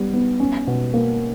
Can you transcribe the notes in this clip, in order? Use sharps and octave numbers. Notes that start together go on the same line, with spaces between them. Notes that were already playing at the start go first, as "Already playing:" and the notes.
Already playing: G3 B3
B3
C#4
B2
A#3